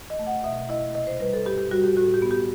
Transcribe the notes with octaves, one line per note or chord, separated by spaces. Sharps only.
D#5
A3
F#5
B2 E5
E4 D#5
C3 D#5
C5
G3 B4
A4
G2 G4
G4
G3 F#4
G4
A2 F#4
G4
B3
G4